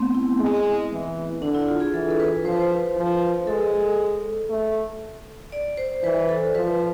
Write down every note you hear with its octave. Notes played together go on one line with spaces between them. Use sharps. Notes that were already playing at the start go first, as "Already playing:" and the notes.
Already playing: A3 B3 C4
E4
G#3
E3
D3 D4
E4
F4
G#4
E3 A4
A4
B4
F3 C5
B4
C5
F3
G#3 A4
A3
D5
C5
E3 B4
A4
F3 B4